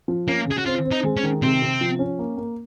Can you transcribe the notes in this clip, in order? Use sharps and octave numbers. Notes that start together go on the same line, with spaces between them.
F3
A#3 C#4
C#3 G#4
F#4
C4 F4
C4
D#4
G#3
C#4
D#3
C3 C4
C3
F3
C#4
A#3
A#3